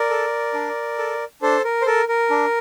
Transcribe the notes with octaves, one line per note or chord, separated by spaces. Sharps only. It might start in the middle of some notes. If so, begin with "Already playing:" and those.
Already playing: A#4 D5
A4
D4
A4
D4 A4 C5
A#4
C5
A4 A#4
A#4
D4